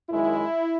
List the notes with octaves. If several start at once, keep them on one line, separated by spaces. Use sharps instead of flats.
F#2 D#3 G#3 E4